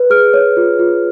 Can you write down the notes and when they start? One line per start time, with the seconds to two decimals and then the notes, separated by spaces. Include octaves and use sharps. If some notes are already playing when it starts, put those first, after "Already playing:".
Already playing: B4
0.10 G#4 F6
0.34 C#5
0.57 F4
0.79 F4